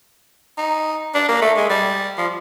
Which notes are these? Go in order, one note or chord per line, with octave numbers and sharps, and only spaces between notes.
D#4
D4
A#3
A3
G#3
G3
F3